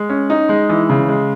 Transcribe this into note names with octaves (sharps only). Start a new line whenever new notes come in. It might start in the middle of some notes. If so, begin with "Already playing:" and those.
Already playing: G#3
C#4
D#4
G#3
E3
C#3
G#3